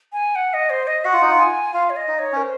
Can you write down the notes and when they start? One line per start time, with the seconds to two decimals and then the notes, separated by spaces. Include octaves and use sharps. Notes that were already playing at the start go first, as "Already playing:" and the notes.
0.13 G#5
0.35 F#5
0.54 D#5
0.70 C5
0.87 D#5
1.05 F#4 F#5
1.13 F4
1.22 D#4
1.30 F4
1.39 G#5
1.73 F4 F5
1.90 C#5
1.96 D#5
2.08 D#4
2.19 C#5
2.32 C#4 A#4
2.42 C5